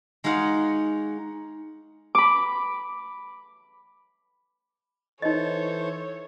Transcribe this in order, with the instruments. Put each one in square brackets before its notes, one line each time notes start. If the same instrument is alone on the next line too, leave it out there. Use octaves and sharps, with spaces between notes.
[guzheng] G#3 D#4 F#4 F5 F#5
[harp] B5 D6
[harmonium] E3 A4 C5 [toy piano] D#4 D#5 [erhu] C#5